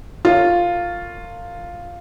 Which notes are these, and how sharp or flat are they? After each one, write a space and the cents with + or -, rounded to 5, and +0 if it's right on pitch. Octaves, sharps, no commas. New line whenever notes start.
F4 +0 A#4 -45 C#5 +5